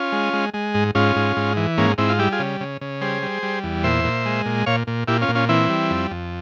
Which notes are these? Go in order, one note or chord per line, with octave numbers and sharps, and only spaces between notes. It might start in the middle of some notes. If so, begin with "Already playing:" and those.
Already playing: C#4 F4
G#3
G#3
G#3
G#2
G#2 C#4 F4
G#2
G#2
E3
G#2 A#3 C#4
G#2 C4 E4
F4
G3 E4 G4
F4 G#4
C#3
C#3
C#3
G3 G#4 C5
G3
G3
E2
A#2 C5 E5
A#2
G#3
A#2
A#2 C#5 F5
A#2
A#2 E4 G4
C#4 F4
A#2
C#4 F4
E3 C4 E4
G3
F2
F2